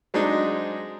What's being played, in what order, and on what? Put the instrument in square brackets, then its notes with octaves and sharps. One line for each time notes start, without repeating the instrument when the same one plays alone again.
[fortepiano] F#3 G#3 C4 D4 D#4